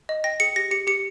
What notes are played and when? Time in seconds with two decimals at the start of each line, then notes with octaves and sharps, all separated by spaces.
0.09 D#5
0.24 G5 A#6
0.40 G#4 C#7
0.56 G4 A#6
0.71 G4 C#7
0.87 G4 C#7